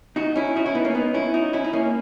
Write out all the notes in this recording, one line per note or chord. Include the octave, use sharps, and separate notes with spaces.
D#4 F#4
C#4 E4
D#4 F#4
C#4 E4
B3 D#4
A#3 C#4
B3 D#4
C#4 E4
D#4 F#4
C#4 E4
D#4
A#3 C#4